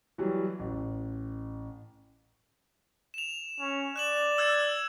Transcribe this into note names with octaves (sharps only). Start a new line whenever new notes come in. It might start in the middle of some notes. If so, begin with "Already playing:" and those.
E3 F#3 G3
A1
E7 F7
C#4
D5 F#6 E7 F#7
E6 F#6 G#6